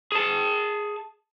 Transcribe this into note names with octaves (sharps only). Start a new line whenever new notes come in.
G#4 A5